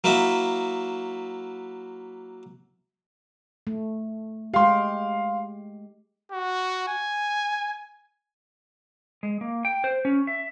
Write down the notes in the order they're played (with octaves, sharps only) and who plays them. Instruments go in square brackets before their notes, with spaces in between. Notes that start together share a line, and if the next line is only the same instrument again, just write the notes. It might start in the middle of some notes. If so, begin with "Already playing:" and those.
[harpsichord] F#3 A#3 E4 F#4 E5
[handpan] A3
[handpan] G#3 G4 [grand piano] F5 C6
[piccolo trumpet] F#4
G#5
[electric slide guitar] G#3
A#3
G5
C5
C#4
E5